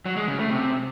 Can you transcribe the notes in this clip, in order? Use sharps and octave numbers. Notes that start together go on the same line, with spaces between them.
F#3
G#3
C#3
A3
C3